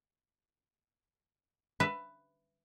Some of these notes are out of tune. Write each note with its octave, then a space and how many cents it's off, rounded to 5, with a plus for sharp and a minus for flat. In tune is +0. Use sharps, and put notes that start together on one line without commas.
B4 +10 E5 +20